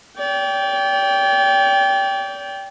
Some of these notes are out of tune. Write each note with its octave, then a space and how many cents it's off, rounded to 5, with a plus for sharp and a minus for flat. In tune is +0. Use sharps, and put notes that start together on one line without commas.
D5 -40 G5 +0